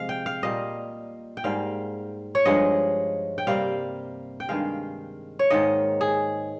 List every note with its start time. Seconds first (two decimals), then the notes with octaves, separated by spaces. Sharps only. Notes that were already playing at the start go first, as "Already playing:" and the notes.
Already playing: C3 F3 G#3 F5
0.09 G5
0.26 F5
0.43 A#2 G3 A#3 D#5
1.37 G5
1.44 G#2 G3 A#3 F5
2.35 C#5
2.45 G2 F3 G#3 D#5
3.38 G5
3.47 C3 G3 A#3 F5
4.40 G5
4.49 G2 D#3 G#3 F5
5.39 C#5
5.50 G#2 D#3 A#3 D#5
6.01 G#4